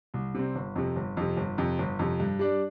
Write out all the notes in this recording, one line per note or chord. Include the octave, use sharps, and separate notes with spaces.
C2
C3 G3 C4
G1
F2 C3
G1
F2 C3
G1
F2 C3
G1
F2 C3
G2
G3 D4